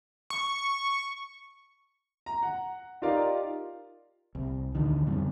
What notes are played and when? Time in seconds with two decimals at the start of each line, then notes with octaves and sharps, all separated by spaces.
0.30 C#6
2.26 A#5
2.43 F#5
3.02 D#4 F4 G4 A#4 D5 F5
4.35 C2
4.75 A1 D2 D3 D#3
5.06 F2 C#3 G3 B3